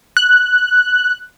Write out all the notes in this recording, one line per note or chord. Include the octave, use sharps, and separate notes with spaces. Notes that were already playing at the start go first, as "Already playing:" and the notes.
F#6